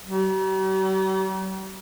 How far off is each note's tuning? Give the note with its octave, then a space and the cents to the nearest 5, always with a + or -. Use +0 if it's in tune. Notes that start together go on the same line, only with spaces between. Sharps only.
G3 -45